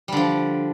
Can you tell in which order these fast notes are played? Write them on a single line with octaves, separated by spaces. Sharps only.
G3 D3 F3